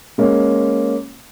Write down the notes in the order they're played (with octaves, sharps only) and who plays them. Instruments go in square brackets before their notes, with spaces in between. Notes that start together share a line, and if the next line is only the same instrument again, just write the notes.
[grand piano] G#3 A#3 C#4